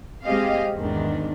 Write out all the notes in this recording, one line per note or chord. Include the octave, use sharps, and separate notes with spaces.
G#3 C4 G4 G#4 D#5 F5
E2 G#2 D#3 D4